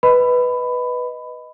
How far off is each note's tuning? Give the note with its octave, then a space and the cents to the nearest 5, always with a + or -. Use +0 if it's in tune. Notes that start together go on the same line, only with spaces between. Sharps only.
B4 +0 D#5 +0 B5 +15